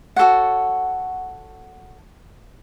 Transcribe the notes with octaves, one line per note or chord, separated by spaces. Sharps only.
F#4 A4 C#5 F#5